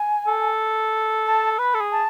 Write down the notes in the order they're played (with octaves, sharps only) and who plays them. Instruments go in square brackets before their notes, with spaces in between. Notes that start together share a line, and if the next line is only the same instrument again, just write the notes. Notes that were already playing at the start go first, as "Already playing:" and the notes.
Already playing: [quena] G#5
[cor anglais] A4
[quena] A5
[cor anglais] B4 [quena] B5
[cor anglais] A4
G#4
[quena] A5